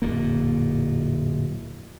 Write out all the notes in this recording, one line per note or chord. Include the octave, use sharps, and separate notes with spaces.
D1 F2 A#2 A#3